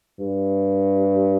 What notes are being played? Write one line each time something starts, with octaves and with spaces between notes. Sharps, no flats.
G2